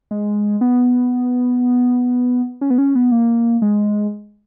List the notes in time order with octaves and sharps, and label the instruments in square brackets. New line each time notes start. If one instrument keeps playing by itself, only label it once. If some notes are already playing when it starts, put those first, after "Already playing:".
[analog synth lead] G#3
B3
C#4
B3
C#4
B3
A#3
G#3